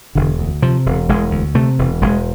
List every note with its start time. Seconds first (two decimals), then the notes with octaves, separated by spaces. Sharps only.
0.15 E1 D3
0.39 D2
0.62 C3 F3
0.86 E1
1.09 E1 G#3
1.31 D2
1.55 C3 A3
1.79 E1
2.02 E1 G#3